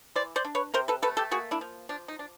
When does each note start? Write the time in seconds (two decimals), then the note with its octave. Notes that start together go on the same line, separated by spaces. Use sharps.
0.16 E3 C5 D5
0.36 C5 D5
0.45 D4
0.55 B4 C#5
0.74 C3 A#4 C5
0.88 A4 B4
1.02 A3 A4 B4
1.17 G4 A4
1.31 A#3 F#4 G#4
1.51 D4 E4
1.61 F3
1.89 F3 D4
2.08 D#4
2.19 D4